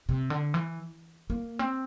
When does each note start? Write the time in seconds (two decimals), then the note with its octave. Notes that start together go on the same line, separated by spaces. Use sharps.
0.09 C3
0.30 D3
0.54 E3
1.30 A#3
1.59 C4